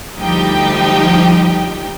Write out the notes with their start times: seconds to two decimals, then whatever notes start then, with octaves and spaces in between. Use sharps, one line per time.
0.20 D2 F3 G3 D#4 G4 G5